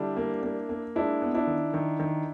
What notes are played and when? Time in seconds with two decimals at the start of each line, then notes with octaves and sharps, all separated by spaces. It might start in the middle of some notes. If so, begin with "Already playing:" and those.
Already playing: D3 G3 D4 E4
0.17 A#3
0.43 A#3
0.69 A#3
0.95 G#3 D4 E4
1.22 B3
1.34 D4 E4
1.47 D#3
1.74 D#3
1.99 D#3